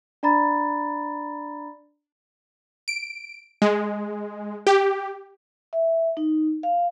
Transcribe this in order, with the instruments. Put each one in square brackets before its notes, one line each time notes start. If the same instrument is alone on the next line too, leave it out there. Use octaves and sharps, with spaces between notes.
[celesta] D4 D5 A#5 B5 A6
[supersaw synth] D7
G#3
G4
[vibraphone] E5
D#4
F5